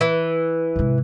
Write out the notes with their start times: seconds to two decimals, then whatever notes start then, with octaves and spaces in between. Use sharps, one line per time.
0.01 E3
0.76 G#2 C3